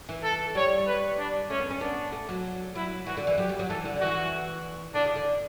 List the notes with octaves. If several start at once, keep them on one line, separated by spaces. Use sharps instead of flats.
E3
A4
G3 C#5
B4
D4
A3 C#4
B3
C#4
B3 D4
A3
F#3
F#3 E4
E3 F#4
D3
E3
F#3 G4
G3
F#3
E3 A4
D3
E3 F#4
D3 D4
C#3
D3